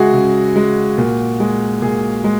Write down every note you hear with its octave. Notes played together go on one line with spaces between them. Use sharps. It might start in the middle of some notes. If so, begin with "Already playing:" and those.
Already playing: C#3 G#3 F#4 G#4 E5
C#3
G#3
A#2
G#3
A#2 G#4
G#3